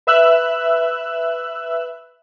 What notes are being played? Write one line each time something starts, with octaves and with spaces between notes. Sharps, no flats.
B4 E5 E6 F#6